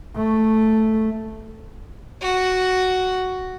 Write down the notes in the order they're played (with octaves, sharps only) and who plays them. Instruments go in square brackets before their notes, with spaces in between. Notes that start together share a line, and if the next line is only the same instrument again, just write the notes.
[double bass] A3
[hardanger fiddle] F#4